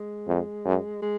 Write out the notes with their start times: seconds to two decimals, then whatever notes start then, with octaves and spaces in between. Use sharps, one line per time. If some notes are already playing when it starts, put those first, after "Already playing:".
Already playing: G#3
0.28 F2
0.65 F#2
1.02 G#3